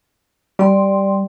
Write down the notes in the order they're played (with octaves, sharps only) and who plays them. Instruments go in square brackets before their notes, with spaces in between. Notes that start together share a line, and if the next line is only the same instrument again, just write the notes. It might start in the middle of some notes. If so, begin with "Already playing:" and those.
[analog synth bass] G3 [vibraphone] D5 G5 C6